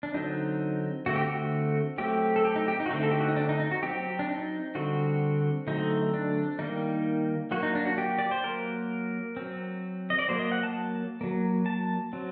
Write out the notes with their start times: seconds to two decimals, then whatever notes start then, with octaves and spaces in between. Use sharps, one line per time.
0.03 D4
0.14 D3 F#3 C4 D#4
1.06 D3 A3 C4 F#4
1.16 G4
1.26 F#4
1.98 F#3 A3 C4 G4
2.36 A4
2.45 G4
2.56 D#4
2.68 G4
2.80 D#4
2.86 F#4
2.91 D3 A3 C4 D#4
3.03 A4
3.11 G4
3.20 F#4
3.29 D#4
3.36 D4
3.49 D#4
3.60 D#4
3.71 F#4
3.83 F#3 C4 G4
4.19 D4
4.29 D#4
4.75 D3 G3 C4 F#4
5.67 D3 F#3 A3 C4 D#4
6.14 D4
6.59 D#3 G3 A#3 D#4
7.51 F#3 A#3 F#4
7.63 D#4
7.75 D4
7.86 F#4
7.98 G4
8.18 D5
8.31 C5
8.44 F#3 A#3 A#4
9.37 F#3 C4
10.10 D#5
10.19 D5
10.28 F#3 A#3 C5
10.39 D#5
10.52 F#5
10.63 A5
11.21 F#3 A#3
11.66 A5
12.13 F#3 C4